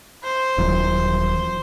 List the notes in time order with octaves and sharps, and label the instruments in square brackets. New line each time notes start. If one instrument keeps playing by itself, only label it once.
[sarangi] C5
[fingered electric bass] D#1 E3 F#3